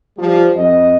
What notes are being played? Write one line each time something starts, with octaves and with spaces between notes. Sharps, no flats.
F3 G3
F2 D#5